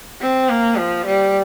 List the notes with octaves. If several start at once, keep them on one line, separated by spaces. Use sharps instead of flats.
C4
A#3
F3
G3